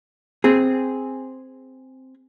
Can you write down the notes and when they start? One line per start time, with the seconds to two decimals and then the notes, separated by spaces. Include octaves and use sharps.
0.44 C4 G#4